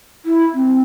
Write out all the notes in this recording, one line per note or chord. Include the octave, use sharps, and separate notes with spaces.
E4
C4